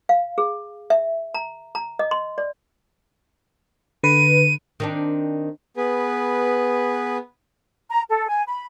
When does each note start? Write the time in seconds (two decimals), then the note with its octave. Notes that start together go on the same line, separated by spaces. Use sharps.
0.09 F5
0.38 G#4
0.90 E5
1.34 A#5
1.75 A#5
1.99 D#5
2.11 C6
2.38 D5
4.03 D3 B4 D#7
4.80 D#3 C4 D4
5.77 B3 G#4 B4
7.90 A#5
8.09 A4
8.27 G#5
8.47 B5